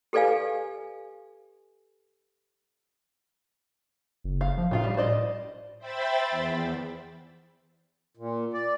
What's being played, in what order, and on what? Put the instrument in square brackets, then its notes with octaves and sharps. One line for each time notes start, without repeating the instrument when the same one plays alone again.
[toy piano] G4 A4 B4 D5 F5 G#5
[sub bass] F#1
[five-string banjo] F5
[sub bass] F3
[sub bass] A2 [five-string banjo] D#3 F4 F5
[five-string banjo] G3
C5 D5 D#5
[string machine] C5 E5 G5 B5 A6
E2
[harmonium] A#2
D5